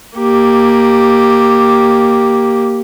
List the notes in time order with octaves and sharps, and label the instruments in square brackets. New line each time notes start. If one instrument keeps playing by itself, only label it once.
[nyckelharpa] A#3 G4